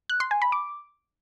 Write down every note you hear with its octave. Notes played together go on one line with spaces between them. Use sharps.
F#6
C6
G#5
B5
D6